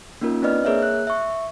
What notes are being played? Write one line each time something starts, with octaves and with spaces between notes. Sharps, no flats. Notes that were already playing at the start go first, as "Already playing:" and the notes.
A#3 C#4 D#4 F4 A#4
C4 D4 B4 D5 D#5 F6
A#3 G#4 A#4 C#5 E5
F#6
E5 C#6